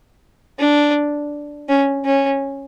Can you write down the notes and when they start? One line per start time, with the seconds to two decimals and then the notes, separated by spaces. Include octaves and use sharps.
0.59 D4
1.69 C#4
2.05 C#4